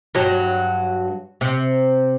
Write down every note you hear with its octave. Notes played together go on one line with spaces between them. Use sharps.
G2 F#3
C3